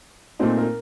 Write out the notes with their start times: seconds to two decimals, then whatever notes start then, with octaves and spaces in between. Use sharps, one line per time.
0.39 A#2 A3 C4 D#4 C5
0.57 A#4